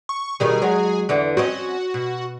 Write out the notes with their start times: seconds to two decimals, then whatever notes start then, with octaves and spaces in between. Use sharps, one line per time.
0.09 C#6
0.40 B2 D#3 G3 G#4
0.62 F#3 G#3
1.09 E2 D3 E3
1.37 C4 C#4 F#4 D#5
1.94 B2